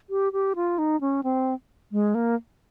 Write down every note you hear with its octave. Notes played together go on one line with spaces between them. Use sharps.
G4
G4
F4
D#4
C#4
C4
G#3
A#3